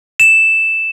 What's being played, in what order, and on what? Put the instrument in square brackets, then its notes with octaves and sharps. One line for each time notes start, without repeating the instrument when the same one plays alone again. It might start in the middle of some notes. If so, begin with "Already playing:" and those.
[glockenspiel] E7